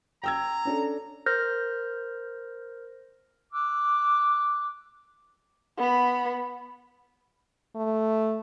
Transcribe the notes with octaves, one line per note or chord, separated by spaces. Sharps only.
G5 A#5 E6 G#6
C#4 D4 A4
A#4 C5 F6 G6 A#6
D6 E6 F#6
B3 B5
A3